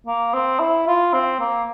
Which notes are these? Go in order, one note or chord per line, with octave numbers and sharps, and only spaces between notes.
A#3
C4
E4
F4
C4
A#3